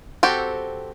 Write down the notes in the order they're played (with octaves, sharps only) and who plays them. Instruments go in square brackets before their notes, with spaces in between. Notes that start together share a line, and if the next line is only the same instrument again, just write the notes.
[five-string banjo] C4 F#4 G4 A4